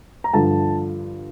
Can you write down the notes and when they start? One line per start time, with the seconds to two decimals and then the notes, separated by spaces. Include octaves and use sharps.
0.24 A#5
0.34 G2 D3 F3 A5